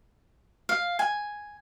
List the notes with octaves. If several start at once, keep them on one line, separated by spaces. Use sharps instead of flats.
F5
G#5